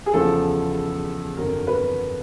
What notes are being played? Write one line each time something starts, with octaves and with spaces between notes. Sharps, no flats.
G#4
E2 C#3 F3 A4
G1 F2 D3 F#3 A#4
B4